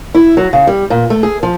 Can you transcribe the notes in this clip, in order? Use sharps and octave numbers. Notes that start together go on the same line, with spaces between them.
E4
F#3
C#3
G3
A#2
A3
G#4
F3